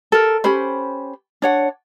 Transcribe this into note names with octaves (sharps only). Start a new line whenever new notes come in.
A4 A#4
C#4 G4 C5 B5
D4 C#5 F#5